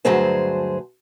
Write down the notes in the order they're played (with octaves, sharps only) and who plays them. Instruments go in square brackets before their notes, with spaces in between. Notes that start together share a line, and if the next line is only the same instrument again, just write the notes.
[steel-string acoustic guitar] D2 G2 F#3 G#4 C5 A5